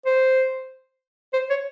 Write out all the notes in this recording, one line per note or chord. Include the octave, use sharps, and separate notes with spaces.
C5
C5
C#5